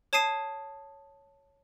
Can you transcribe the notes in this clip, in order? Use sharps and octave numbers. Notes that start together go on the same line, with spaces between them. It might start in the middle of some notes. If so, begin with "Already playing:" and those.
C#5 A5 D#6 C7 D#7